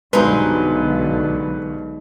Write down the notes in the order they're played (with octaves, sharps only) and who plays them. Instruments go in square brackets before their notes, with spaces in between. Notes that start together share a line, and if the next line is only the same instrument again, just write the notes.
[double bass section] B1 D3 [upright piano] G2 B2 C5 [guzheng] G#3 D#4 [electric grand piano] B4